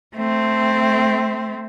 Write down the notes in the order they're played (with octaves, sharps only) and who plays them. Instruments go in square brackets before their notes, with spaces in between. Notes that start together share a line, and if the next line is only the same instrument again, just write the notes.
[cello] A3 C4